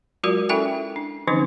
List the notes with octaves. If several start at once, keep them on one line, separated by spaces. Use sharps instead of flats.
F#3 G#3 F4 F#4 A#4 D5
C#4 E4 A4 E5 G5 G#5
D4
D3 E3 F3 C4 C#4 D#4